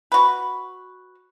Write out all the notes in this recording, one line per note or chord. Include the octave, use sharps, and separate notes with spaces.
F#4 B4